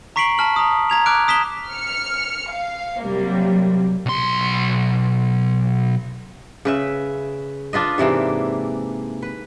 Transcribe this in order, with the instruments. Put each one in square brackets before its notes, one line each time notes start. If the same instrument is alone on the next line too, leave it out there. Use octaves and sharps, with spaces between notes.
[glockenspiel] A#5 C#6 B6 C7 D7 F#7
A5 F6 F#7
A#5 D#6
A#5 G#6 F7
D6 F6 F#6 D7
D#6 B6 E7 G7
[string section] F6 C#7
F5
C3 F#3 G3 A#3
[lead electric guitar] B1 C6
[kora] C#3 B4 E5
D4 F4 B4 D#5
G#2 C3 E3 A#3
B4